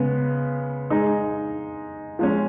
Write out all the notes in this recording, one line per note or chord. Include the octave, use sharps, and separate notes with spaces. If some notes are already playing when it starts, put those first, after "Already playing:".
Already playing: C#3 G#3 B3
G#3 D#4 G#4
F3 G#3 C#4